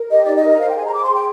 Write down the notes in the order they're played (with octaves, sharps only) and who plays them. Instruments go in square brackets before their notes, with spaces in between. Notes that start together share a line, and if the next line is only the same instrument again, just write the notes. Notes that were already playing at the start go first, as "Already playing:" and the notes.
Already playing: [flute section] A#4
G4 D#5
D#4 D5
D#5
A#4
C5 F5
G5
G#4 G#5
A#5
C5 D6
C6
G#4
G5